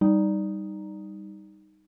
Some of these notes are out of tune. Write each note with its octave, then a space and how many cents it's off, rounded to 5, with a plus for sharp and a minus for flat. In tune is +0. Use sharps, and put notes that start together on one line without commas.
G3 +0 D#4 +0